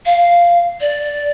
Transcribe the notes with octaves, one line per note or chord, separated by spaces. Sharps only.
F5
D5